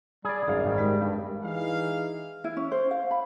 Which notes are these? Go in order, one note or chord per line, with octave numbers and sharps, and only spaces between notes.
G3 G#4 D5
G#1 F#2 G#4 F5
G#1 D#3
G#3 G4 A#4
G2
E3 D#4 G#4 F5
E4
C#4
C5
F5
B5